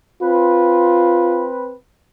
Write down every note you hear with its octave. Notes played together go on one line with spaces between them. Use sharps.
C4 F4 B4